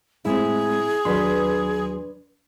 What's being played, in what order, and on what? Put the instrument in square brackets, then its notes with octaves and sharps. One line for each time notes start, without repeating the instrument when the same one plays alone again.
[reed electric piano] A2 G#3 C4 [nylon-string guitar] E4 [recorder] G#4
[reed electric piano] D#2 F#3 C6 [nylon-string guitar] D4 B4